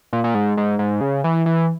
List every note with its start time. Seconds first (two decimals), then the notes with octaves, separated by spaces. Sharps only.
0.13 A#2
0.24 A#2
0.35 G#2
0.57 G#2
0.79 G#2
1.01 C#3
1.24 E3
1.46 E3